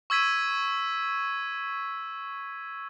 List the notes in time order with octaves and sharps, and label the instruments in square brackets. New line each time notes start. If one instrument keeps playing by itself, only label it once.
[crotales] C#6 E6 G#6 B6 D#7